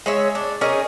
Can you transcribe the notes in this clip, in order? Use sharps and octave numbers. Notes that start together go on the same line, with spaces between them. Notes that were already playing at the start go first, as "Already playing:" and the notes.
G#3 C#5 E5
D4
C#4 D#4 G#4 A#4